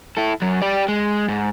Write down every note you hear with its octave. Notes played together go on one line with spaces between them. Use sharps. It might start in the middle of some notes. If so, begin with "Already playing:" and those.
E4 A4
F#2 F#3
G4 D5
G#3
G#2